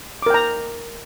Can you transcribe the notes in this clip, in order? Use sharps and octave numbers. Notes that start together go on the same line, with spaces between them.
A#4 G5 A#5 D6